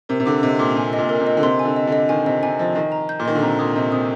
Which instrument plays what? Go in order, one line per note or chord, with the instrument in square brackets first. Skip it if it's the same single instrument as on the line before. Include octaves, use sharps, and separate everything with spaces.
[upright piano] C3 [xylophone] A#4
[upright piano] C3
[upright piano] D3 [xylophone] D6
[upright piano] C3 [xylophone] D#5
[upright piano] A#2 [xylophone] D6
[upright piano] C3 [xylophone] G#5
[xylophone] D#5
[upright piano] A#2
[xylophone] A#4
[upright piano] C3
[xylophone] D#5
[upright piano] D3
[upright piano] C3 [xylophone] C6
[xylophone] G#5
[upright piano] D3
[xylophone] D#5
[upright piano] D3
[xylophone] D#5
[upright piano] D#3 [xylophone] G#5
[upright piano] C3 [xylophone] D#5
[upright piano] C3 [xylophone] G#5
[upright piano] F3 [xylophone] D#5
[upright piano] D#3 [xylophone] D#5
[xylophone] A#5
G6
[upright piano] A#2
[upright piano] D#3 [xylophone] D#5
[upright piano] D3
[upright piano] C3 [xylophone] A#5
[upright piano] A#2 [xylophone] D#6
[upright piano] C3 [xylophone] D#5
[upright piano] C3 [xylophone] D#6